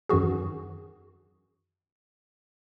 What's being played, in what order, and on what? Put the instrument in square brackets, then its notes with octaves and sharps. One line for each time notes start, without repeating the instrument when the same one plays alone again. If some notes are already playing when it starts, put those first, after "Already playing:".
[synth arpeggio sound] F#2 D#3 E3 F#4 G#4